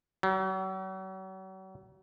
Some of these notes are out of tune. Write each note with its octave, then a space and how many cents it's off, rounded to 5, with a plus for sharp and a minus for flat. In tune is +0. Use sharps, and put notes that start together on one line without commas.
F#3 +40